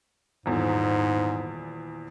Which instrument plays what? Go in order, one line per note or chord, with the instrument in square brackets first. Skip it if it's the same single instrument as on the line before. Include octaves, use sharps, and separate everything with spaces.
[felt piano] D#1 E2 [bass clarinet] G#2